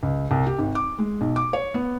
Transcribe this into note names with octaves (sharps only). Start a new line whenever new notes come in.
C#2
C2
G4
G#1
D6
G#3
B1
D6
C#5
B3